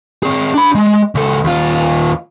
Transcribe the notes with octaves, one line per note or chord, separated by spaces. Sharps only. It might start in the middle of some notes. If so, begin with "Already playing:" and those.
C4 G#4
D4 B5
G#3
C#2 A4
D#2 F4